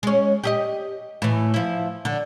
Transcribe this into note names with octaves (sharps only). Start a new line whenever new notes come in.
G#3 C#4
G4 G#4 D#5
A2 E3
F3 E4
D3